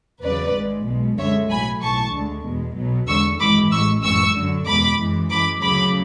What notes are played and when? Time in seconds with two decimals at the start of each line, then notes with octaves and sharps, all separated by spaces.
0.23 E2 C#3 F#3 B4 D5
0.54 G#1 G#2 G#3
0.86 B1 B2 G#3
1.18 F#2 D3 G#3 C#5 E5
1.50 B1 A2 F#3 G#5 B5
1.81 B1 A2 E3 A5 C#6
2.13 D2 D3 G#3
2.45 E2 B2 G#3
2.77 B1 B2 F#3
3.08 E2 D3 G#3 C#6 E6
3.40 G#1 F#2 E3 G#3 B5 D6
3.71 A1 A2 G#3 C#6 E6
4.03 F#2 E3 G#3 C#6 E6
4.35 F#2 D3 F#3
4.66 E2 B2 G#3 B5 D6
4.98 F#2 E3 G#3
5.30 F#2 E3 G#3 B5 D6
5.62 D2 C#3 F#3 B5 D6